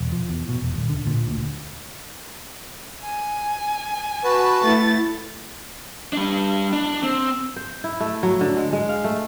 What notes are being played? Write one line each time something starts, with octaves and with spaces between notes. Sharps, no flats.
E1
F3
E2
B2
E1
D#1
D3
A#2
D2
G#5
F#4 B4 A5
A3 E4 A6
G3 D4
D4
C4
C5
E4
A3
F#3
D3
G#3
G#3
F5
A3